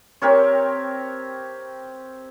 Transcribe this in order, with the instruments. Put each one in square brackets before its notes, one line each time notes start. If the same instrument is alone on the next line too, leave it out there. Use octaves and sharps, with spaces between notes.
[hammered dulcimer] C4 G4 A#4 C#5